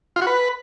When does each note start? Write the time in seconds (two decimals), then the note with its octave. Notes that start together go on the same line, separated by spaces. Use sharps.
0.16 F4
0.21 F#4
0.27 B4